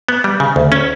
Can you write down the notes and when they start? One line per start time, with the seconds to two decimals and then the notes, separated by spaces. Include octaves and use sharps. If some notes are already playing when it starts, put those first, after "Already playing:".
0.09 B3
0.24 G3
0.40 C#3
0.56 D2
0.72 C#4